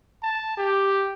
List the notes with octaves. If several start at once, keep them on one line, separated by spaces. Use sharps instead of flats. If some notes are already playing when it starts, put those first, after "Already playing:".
A5
G4